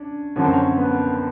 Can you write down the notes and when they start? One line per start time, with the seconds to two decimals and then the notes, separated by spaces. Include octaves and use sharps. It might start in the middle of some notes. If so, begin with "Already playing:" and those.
Already playing: C#4 D4
0.36 F#2 D3 F3 C#4
0.45 C4
0.53 C#4
0.77 B3